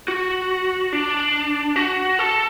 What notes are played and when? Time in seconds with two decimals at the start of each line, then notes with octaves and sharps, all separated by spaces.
0.08 F#4
0.93 D4
1.76 F#4
2.19 A4